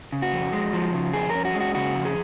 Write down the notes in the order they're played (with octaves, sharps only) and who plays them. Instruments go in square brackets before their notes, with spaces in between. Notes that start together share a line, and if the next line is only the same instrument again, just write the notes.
[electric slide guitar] C#3
F#4
F2
G#3
F3
C#3
F2 G#4
A#4
C#4
F#4
G#3
F#4
C#3 F#4
F2
G#4